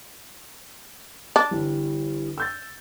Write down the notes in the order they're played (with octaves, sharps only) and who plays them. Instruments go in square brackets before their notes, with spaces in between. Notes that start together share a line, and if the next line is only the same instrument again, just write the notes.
[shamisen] D4
[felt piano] G1 E3 G3
E6 G6 A6